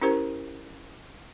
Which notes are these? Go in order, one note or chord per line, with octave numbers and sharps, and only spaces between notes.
C#4 E4 G4 A#4 C5